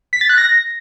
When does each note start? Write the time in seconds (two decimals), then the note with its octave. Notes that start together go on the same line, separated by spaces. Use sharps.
0.13 B6
0.21 A6
0.30 F#6
0.38 A#6